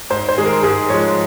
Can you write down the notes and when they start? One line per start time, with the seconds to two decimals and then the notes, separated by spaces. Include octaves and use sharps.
0.10 G#2 C5
0.29 C5
0.37 D#3 G#3 G#4
0.46 A#4
0.63 G#2 G#4
0.89 F3 G#3 C#5